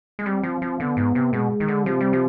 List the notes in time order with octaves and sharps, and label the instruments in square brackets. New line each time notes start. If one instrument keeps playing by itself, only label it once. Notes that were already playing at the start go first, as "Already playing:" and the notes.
[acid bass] G#3
[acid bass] G3 [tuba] C4
[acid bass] F3
F3
[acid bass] D3 [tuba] B3
[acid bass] G#2
C3
[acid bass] B2 [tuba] G#3
[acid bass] D#3
D3
[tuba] C3 [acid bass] F3
[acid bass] G3
F3